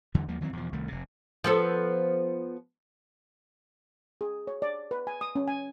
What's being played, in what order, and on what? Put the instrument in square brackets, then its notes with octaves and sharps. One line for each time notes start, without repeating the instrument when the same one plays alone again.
[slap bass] E2 D3 E3 G3
D#2 F3 G3 A#3
D#3 E3 F#3 C4
E2 B2 F3
C2 D#3 A3
F1 C3
[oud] F3 B3 A4
[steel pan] G#4
C#5
D5
B4
G#5
D#6
C#4
G#5